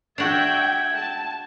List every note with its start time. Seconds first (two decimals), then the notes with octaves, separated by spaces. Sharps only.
0.18 D4 F#4 E5 G5 G#6
0.96 A5